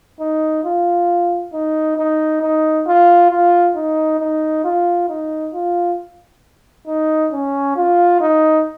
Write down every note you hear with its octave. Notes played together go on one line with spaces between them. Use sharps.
D#4
F4
D#4
D#4
D#4
F4
F4
D#4
D#4
F4
D#4
F4
D#4
C#4
F4
D#4